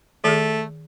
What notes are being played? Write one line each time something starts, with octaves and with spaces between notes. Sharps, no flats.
D#3 A3 G#4